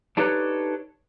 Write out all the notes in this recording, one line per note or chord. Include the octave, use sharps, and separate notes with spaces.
D4 D#4 G4 A4 B4 C#5